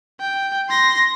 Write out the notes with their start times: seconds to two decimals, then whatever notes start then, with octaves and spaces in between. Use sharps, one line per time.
0.20 G5
0.69 C6 A#6